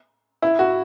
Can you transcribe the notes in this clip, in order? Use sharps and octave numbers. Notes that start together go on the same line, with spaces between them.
E4
F#4